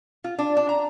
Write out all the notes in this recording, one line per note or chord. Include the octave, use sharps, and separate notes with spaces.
F4
D4
D4
A#5